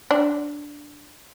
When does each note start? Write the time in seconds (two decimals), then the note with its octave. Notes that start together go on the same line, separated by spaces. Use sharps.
0.11 D4